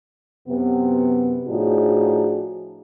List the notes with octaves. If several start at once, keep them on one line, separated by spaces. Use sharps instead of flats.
F#2 C3 B3
A2 F3 D4 D#4 F#4 G#4